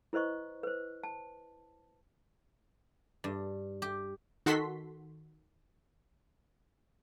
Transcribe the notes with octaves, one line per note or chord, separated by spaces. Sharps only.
E4 B4 C5 D#5 C#6
B4 C5
A5
G2
G4
D#3 F#4 A4 C6 B6